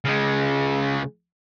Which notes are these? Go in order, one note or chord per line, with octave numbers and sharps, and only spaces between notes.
C#3 G#3